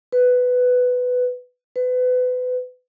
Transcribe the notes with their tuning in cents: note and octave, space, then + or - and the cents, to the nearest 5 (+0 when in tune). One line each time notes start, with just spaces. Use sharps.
B4 +10
B4 +30